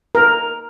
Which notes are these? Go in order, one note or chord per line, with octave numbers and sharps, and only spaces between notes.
A#4